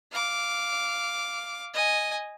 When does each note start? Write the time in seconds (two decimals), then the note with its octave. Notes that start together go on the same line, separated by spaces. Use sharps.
0.11 F5 D6
1.74 D#5 G#5